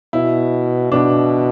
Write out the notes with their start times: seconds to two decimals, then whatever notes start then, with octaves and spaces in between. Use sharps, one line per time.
0.13 B2 E4
0.92 B2 D4